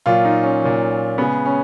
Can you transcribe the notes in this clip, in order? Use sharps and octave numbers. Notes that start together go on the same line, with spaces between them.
A#2 F#3 F4
D#4
C#4
A#2 F#3
C#3 G#3 B3
C#4